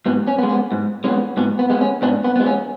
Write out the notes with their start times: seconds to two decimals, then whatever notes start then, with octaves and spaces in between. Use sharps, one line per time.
0.06 G#2 B3
0.27 C#4
0.38 B3
0.43 G#3
0.49 B3
0.72 G#2
1.04 G#3 B3 C#4
1.37 G#2 B3
1.59 B3
1.70 G#3 B3
1.81 C#4
2.02 G#2 B3 D4
2.24 B3
2.36 G#3 B3
2.46 C#4